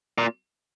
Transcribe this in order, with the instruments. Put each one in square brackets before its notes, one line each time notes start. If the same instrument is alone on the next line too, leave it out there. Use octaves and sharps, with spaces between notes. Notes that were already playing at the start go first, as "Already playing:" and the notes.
[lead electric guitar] A#2